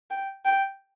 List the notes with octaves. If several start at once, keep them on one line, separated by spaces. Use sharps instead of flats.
G5
G5